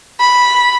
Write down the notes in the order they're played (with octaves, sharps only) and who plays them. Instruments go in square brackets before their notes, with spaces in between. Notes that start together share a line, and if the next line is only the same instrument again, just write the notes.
[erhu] B5